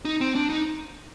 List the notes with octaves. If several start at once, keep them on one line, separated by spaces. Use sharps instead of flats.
D#4
C4
D4
D#4